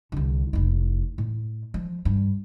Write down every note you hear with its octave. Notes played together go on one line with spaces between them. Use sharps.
C2 D3
F1 E4
A2
F3
G2